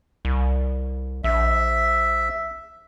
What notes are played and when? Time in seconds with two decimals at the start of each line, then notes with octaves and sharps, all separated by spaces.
0.25 C2
1.24 A#1 E5